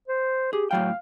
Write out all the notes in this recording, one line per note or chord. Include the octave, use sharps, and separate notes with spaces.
C5
G4 G#4
A2 F#3 F5 G5